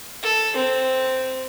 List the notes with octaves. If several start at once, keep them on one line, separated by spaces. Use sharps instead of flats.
A4
C4